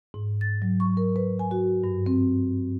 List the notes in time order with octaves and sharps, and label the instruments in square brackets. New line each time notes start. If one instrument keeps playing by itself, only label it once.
[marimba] G#2
A6
F#3
C#6
A#4
B4
G#5
F#4
G2
C4